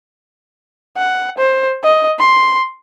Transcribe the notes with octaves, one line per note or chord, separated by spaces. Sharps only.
F#5
C5
D#5
C6